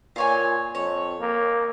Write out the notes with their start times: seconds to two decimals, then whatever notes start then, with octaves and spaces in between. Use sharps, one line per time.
0.16 A#2 F4 C#5 G#5
0.75 F2 C#5
1.20 A#3